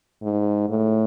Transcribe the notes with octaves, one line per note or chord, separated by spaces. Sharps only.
G#2
A2